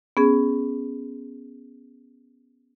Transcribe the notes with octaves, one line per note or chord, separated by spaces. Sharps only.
B3 C#4 G#4